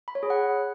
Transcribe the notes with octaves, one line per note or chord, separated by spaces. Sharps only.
B5
C#5
G#4
F#5